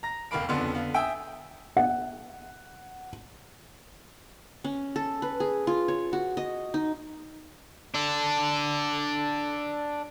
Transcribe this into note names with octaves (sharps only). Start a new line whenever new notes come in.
A#5 A#6
F1 D#2 A#3 F5 B5 D7
F#1 F2 D3 B3 C6
D3 B3 F5
E5 G5 G#5 D#6 E6
F#5
C#4
A4
B4
G#4
F4
C#5
F#4
D#5
D#4
D4 A4